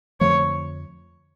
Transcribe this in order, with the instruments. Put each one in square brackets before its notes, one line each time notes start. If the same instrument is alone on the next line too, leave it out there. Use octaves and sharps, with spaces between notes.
[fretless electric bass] F2 D3 F3 A3 [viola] C#5